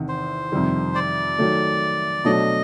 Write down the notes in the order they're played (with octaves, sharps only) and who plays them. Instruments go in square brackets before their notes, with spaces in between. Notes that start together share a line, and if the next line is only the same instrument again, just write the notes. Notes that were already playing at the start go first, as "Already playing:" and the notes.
Already playing: [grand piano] E2 C3 D#3
[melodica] C5
[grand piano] F2 C3 D#3 G3
[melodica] D5
[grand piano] D#3 F#3 A3
[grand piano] B2 F#3 A3 D4 [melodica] D#5